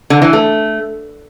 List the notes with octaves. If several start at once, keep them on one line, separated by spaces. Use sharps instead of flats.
D3
E3
A3